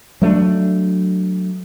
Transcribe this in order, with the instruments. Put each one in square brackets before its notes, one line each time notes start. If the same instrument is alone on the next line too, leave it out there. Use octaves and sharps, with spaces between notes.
[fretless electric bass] F#3 A3 B3 D4